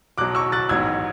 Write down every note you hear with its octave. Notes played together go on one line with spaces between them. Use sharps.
B1 B2 F#3 D6 F#6
C#6 E6
F#6 A6
A1 G#2 F#3 B3 E6 G#6